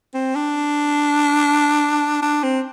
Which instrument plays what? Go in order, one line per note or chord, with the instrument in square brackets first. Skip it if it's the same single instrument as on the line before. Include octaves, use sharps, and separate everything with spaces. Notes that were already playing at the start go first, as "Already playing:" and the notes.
[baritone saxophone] C4
D4
D4
C4